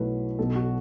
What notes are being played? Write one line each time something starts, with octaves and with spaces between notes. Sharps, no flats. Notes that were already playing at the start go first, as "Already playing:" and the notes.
Already playing: B1 B2 F#3 A3 E4 B4
B1 B2 F#3 A4
F#4